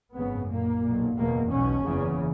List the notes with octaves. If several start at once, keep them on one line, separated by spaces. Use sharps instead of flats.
G#1 F#2 C#3 B3
B1 A#2 A#3
B1 A#2
F#1 E2 B2 A#3
B1 B2 C#4
F#1 E2 C#3